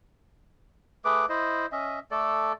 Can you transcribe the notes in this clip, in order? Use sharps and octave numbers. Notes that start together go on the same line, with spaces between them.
A3 G#4 B4 D6
E4 C5 D#5
C#4 D#5 E5
A3 A4 D5